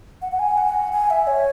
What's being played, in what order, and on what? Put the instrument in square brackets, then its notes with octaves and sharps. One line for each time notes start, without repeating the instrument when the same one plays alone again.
[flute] F#5
F#5
G#5
F#5
G#5
E5
C#5